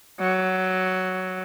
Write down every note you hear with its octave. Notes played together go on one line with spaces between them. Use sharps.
F#3